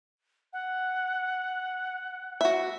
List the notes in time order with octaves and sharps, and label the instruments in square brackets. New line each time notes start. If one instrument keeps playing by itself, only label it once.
[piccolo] F#5
[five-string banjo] F#4 E5